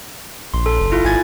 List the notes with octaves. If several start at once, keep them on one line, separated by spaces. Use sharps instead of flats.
A#1 C6
A4
F#1
E4 F4
G#1 G#5 G#6 A6